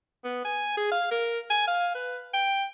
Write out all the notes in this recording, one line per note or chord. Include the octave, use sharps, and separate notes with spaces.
B3
G#5
G#4
F5
A#4
G#5
F5
B4
G5